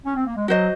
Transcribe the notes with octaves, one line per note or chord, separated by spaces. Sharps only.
C#4
C4
A#3
G#3
F#3 F#4 C5 D#5